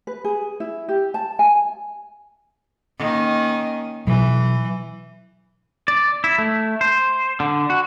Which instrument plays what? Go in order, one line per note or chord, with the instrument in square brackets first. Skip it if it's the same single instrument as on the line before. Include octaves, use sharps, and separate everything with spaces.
[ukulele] B4
G#4
E4
G4
A5
G#5
[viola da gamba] D#3 A#3 C#4
[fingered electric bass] B2 F#3 [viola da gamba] E3
[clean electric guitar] D5
E4
A3
C5
D3
F#4